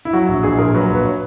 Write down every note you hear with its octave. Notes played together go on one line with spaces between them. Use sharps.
E4
F#3 F#4
A#1 F#4
A#1 G#4
A#2 A#4
F#3 B4
A#1
B4
C#5